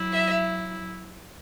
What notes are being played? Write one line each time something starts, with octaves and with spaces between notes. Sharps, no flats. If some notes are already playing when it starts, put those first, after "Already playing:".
Already playing: F#3 E4
E5